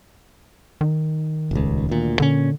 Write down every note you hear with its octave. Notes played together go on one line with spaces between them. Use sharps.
D#3
D#1 C#2
D2 A#2
A#2 D3 C#4